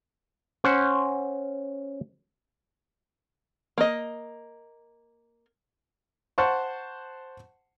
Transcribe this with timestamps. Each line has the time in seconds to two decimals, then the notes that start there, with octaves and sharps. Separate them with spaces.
0.64 C#4 C5 F#5
3.78 A#3 D#5
6.38 C5 F#5 A5 C6 C#6